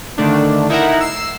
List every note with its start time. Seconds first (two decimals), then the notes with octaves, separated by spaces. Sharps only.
0.18 D3 D#3 A3 D4
0.69 D#4 E4 A#4 E5 F#5 A#5
1.01 E6 C7